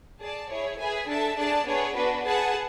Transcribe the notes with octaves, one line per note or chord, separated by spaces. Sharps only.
G#4 D5 A5
E4 G#4 C#5
G#4 B4 E5 G#5
D4 A4 E5 A5
D4 G#4 D5 A5
B3 D4 G#4 C#5
D4 F#4 B4
G#4 B4 F#5 A5